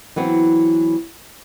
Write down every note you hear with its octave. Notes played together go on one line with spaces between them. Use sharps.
E3 F#3 B3 C4